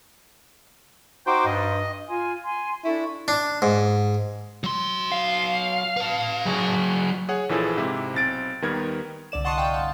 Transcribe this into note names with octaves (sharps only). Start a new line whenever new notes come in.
D#4 F#4 C5 G5 D6
G2 D#5
F4 G#5 C6
G#5 C6
D4 E4 A4 C#6
D4
G#2
F#3 C6
F5
B4 A5
F#3 G#4
G#4 C#5 F#5
A#1 E3 F3 E4 G#4 A4
G#2 C3 E4 G4
B1 C4 A6 D7
D#2 D#3 G3 B3 A#4 G#6
C2 D3 D5 E7
D#5 F#5 A5 C6 C#6 D#6
F5 G5
G1 A5